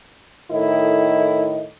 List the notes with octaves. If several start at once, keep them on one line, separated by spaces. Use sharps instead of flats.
A2 D#3 E4 A4 D#5